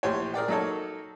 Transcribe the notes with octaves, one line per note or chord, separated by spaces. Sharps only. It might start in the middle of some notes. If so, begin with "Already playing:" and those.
A#1 A2 G4 C5 C#5
G#4 A#4 D5 G5
F#3 A#3 D#4 A4 C#5